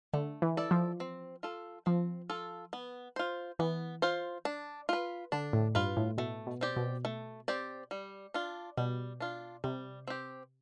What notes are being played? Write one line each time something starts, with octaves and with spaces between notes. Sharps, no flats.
D3 A3
E3
E4 A4 D5
F3
C4
F4 A4
F3 C4
F4 A4
B3
F4 C5
E3 B3
F4 C5
D4
F4 B4
D3 D4
A2
G2 F4 B4
A2
B2 A3
B2
C4 G4 D5
B2
A3
C4 G4 D5
G3
D4 F4
B2 G3
D4 F4
C3 G3
C4 G4